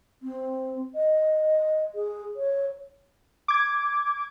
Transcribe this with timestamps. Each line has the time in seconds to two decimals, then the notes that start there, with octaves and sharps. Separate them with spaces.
0.22 C4
0.95 D#5
1.95 G#4
2.36 C#5
3.48 D6 G#6